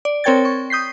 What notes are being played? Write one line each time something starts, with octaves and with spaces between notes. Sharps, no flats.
D5
C4 A#4 C#5 G5 G#6 A6
C#6
D#6 G6 B6 C7